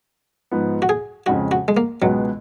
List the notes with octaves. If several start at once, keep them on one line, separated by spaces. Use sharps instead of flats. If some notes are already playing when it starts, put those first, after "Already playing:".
G#2 F3 B3
F#4
G#4
F2 C#3 G#3 F#4
F#4
G#3
A#3
C#2 B2 F#3 G#3 B3